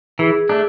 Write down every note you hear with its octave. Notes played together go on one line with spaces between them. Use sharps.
E3 G#4
A3 D4